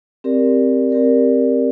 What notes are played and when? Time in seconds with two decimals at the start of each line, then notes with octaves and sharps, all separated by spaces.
0.24 C4 G4 A#4 D5
0.90 C4 G4 A#4 D5